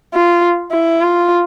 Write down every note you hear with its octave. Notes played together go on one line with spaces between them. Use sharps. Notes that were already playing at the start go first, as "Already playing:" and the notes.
F4
E4
F4